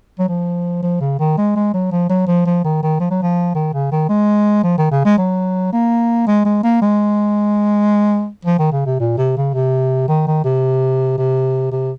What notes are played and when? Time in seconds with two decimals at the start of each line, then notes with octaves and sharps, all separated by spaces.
0.19 F#3
0.29 F3
0.83 F3
1.01 C#3
1.19 D#3
1.38 G#3
1.56 G#3
1.74 F#3
1.92 F3
2.10 F#3
2.27 F3
2.46 F3
2.64 D#3
2.83 D#3
3.00 F3
3.11 F#3
3.22 F3
3.55 D#3
3.74 C#3
3.92 D#3
4.09 G#3
4.63 F3
4.78 D#3
4.91 C#3
5.05 G#3
5.18 F#3
5.73 A#3
6.27 G#3
6.45 G#3
6.63 A#3
6.82 G#3
8.45 F3
8.59 D#3
8.73 C#3
8.86 C3
9.00 A#2
9.18 C3
9.37 C#3
9.54 C3
10.08 D#3
10.27 D#3
10.45 C3
11.18 C3
11.72 C3